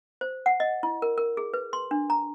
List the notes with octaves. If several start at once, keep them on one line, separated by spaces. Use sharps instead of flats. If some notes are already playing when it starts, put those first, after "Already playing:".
C5
F#5
D#5
E4
A#4
A#4
G#4
B4
C6
D4
A#5